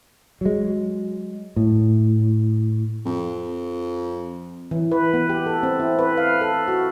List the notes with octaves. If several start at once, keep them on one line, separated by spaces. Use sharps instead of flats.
F#3 G#3
A2
F2
E3
B4
B3
G4
A4
C4
E4
B4
F5
A4
F#4